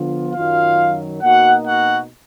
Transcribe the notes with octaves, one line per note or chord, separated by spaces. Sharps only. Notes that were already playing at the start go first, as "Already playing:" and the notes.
Already playing: D3 F3 B3 F4
F#2 D#3 F#3 F4 F5
B2 A#3 D#4 F#4 F#5
F#4 F#5